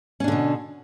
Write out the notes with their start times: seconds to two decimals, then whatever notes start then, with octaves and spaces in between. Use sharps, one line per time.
0.20 C#4
0.24 D4
0.28 D3
0.32 B2